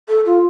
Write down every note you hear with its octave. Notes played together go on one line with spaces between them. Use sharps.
A4
F4